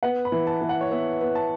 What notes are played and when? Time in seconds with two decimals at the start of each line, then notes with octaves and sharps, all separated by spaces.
0.03 B3 F#5
0.25 B5
0.32 E3
0.47 A5
0.62 E3
0.69 F#5
0.81 C#5
0.91 B3 E5
1.21 B3
1.35 A5